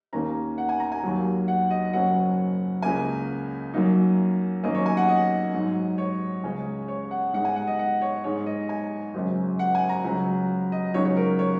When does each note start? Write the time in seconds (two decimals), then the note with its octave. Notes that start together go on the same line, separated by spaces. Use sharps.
0.13 D#2 D#3 A#3 C#4 A#5
0.58 F#5
0.69 G#5
0.80 A#5
0.92 G#5
1.02 D#2 D#3 F#3 A#3
1.48 F#5
1.71 D#5
1.93 F#1 F#2 F#3 C#4 F#5
2.82 C#2 C#3 A#3 G#5
3.74 F#2 F#3 A#3 D#4
4.63 F#2 D#3 A#3 C#4 D#5
4.75 C#5
4.86 G#5
4.97 F#5
5.08 D#5
5.53 G#2 F#3 D#4
5.98 C#5
6.43 C#2 C#3 G#3 C#4
6.88 C#5
7.11 F#5
7.33 G#2 G#3 D#4 F#5
7.45 G#5
7.56 F#5
7.67 D#5
7.79 F#5
8.02 C#5
8.24 G#2 G#3 D#4 C#5
8.46 D#5
8.69 G#5
9.14 G#1 F#2 C#3
9.59 F#5
9.75 G#5
9.89 A#5
10.04 C#2 C#3 F#3
10.72 D#5
10.94 C#2 C#3 F#3 D#4 C#5
11.05 C#5
11.17 A#4
11.39 C#5